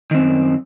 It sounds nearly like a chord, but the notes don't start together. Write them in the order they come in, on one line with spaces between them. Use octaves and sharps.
D#3 C4 F#2